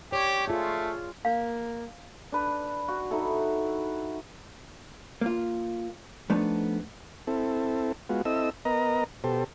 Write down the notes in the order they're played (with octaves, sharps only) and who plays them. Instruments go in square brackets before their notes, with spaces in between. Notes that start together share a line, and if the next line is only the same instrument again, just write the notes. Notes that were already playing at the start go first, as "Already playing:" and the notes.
[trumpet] G4 [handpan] C#5 D5
[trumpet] A3 [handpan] F4 G#4
[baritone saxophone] A#3 [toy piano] F5
[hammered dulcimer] D4 B4
F#4
D#4 E4 A4
[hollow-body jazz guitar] A#3 F4
F3 A3 B3 D4 D#4
[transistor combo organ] C4 E4 A4
G#3 B3 F4 F#4
C4 E4 A4 D#5 E6
B3 A#4 D#5 A#5
B2 G4 A4 C5